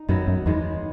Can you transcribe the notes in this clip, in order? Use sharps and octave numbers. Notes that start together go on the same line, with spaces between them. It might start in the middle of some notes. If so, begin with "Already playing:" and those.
Already playing: D#4
F#2 D#3 F#3 B3
F#2
E2 G#2 D#3 G#3 B3